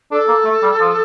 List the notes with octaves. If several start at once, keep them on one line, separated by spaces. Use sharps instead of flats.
D4 A4
A#3
A3
G3
F3